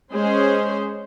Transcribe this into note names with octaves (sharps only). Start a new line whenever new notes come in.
G#3 C#4 G#4 C5